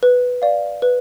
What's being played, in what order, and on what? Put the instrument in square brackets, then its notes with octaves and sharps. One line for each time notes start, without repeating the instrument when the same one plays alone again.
[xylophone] B4
D5 F5
B4